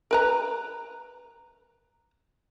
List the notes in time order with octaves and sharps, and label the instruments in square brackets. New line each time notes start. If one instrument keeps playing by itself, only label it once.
[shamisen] A#4 B4 A#5